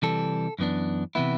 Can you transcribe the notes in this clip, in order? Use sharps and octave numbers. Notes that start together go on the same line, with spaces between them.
C3 E3 G3 A4
F#2 E3 B3 D4
C3 E3 B3 E4